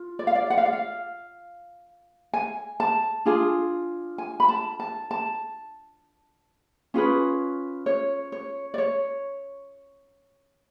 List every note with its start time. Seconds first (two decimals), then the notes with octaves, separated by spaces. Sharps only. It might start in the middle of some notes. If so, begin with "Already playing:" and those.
Already playing: F4
0.19 D5
0.27 F5
0.35 D5
0.50 F#5
0.58 F5
0.66 D5
0.73 F5
2.33 G#5
2.80 A5
3.26 D4 F4 G#4
4.18 G#5
4.40 B5
4.49 A5
4.80 A5
5.11 A5
6.94 C#4 F4 G#4 B4
7.86 C#5
8.32 C#5
8.74 D5
8.78 C#5